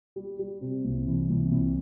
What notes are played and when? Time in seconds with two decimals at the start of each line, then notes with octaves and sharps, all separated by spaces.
0.16 G3
0.39 G3
0.61 C3
0.84 C2
1.07 E3
1.30 C2
1.51 C2